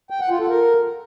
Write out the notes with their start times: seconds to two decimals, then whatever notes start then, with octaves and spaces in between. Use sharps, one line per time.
0.10 G5
0.20 F#5
0.30 F4
0.40 A4
0.50 A#4